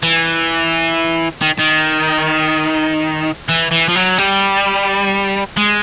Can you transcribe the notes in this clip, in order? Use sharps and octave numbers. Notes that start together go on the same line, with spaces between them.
E3
D#3
D#3
E3
E3
F3
F#3
G3
G#3